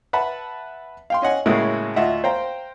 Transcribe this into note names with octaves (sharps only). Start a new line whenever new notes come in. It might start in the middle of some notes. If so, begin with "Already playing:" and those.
B4 E5 F#5 A5 B5
F5 G5 C6
C#4 D#5 F#5 G#5
A2 C#3 G#3 A#3 E4 F#4
D2 F4 D#5 E5 F#5
C5 F5 G5 A#5